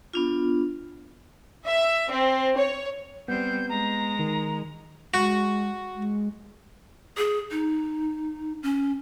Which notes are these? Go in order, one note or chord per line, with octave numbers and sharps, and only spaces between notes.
B3 D4 F4
E5
C4
C#5
G3 B3 C4 G6
G#3 A#5
D#3
G#3 F#4
G#3
G#4
D#4
C#4